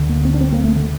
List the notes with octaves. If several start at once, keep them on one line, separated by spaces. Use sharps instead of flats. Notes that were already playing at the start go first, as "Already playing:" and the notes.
Already playing: D2 D3
A#3
C4
D4
C4
A#3
A3
D3